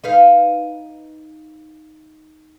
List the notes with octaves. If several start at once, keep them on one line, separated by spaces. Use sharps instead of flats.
D#4 B4 F5